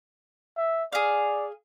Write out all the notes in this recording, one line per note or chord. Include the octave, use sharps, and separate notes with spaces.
E5
G#4 D5 F5